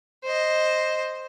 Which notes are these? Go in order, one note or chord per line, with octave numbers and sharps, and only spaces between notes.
C5 D#5